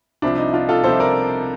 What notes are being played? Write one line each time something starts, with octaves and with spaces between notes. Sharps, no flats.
C2 C3 F3 D4
D#4
D4 F4
F4 A4
C2 C3 F3 A4 C5
A#4 D5